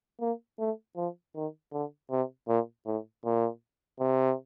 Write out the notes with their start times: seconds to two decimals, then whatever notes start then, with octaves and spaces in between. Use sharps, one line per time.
0.20 A#3
0.59 A3
0.96 F3
1.35 D#3
1.72 D3
2.11 C3
2.48 A#2
2.86 A2
3.25 A#2
4.00 C3